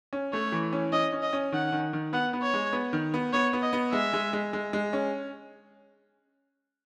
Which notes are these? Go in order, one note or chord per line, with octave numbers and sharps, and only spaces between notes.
C#4
A3 C#5
E3
C#4
C#4 D#5
C#4
D#5
C#4
D#3 F#5
D#3
D#3
B3 F#5
B3
C#5
G#3
B3
D#3
B3
B3 C#5
B3
D#5
B3
G#3 E5
G#3
G#3
G#3
G#3
C#4